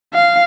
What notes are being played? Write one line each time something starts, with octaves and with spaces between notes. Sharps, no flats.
F5